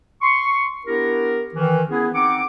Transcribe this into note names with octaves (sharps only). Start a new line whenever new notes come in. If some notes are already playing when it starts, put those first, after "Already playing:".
C6 C#6
B3 D4 E4 G4 A#4
D#3 E3
B3 C#4 E4 G#4
C4 D#4 F#5 D6